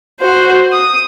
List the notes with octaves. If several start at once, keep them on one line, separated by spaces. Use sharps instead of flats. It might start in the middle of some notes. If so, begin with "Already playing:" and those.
F#4 C5
D#6